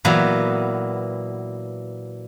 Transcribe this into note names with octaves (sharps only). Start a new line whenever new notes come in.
A#2 E3 F#3 B3